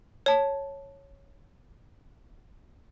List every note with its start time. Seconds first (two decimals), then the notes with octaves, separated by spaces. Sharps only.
0.26 C#5 A5